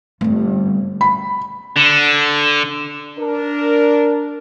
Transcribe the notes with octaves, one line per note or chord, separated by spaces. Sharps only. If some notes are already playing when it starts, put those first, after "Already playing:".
G1 G2 A3 C4
B5
D3
D4 A#4